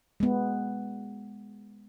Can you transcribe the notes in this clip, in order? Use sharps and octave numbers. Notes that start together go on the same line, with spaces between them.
G#3 B3